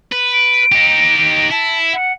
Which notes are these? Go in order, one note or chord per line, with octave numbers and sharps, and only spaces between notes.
B4
D7
D#4 G4
E4 A5
F#5